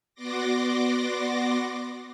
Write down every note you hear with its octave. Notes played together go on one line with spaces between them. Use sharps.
B3 F#4 D5 C6 D6 A#6